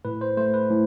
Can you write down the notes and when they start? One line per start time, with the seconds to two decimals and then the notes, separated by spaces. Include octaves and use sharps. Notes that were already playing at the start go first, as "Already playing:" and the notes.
0.05 A2 B4
0.21 C5
0.37 A3 C5
0.54 B4
0.70 A2